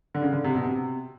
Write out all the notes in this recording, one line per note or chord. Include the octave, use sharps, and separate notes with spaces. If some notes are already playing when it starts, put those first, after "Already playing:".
D3
C#3
D3
C3
B2
C3